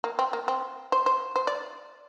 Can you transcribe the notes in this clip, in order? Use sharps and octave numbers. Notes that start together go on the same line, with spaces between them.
A#3
C4
A#3
C4
C5
C5
C5
D5